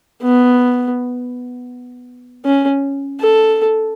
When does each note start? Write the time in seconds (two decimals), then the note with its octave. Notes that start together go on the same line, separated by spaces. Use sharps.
0.23 B3
2.45 C#4
3.20 A4